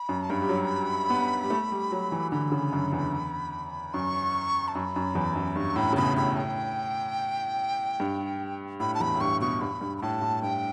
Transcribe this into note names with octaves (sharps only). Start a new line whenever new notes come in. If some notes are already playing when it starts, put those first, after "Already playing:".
Already playing: B5
F#2
A5
G2 B5
G3
F#3
B3
G3
A3
G3
F#3
E3
D3 B5
C#3
F#2
E2
F#2 C#6
A5
F#2 B5
F#2
E2
F#2
G2 C#6
A2 B5
C#3
B2 B5
A2 B5
G5
G2
A2 B5
A5
E2 B5
A2
G2 C#6
B2 C#6
G2 B5
G2
B5
A2 A5
A2
G2 G5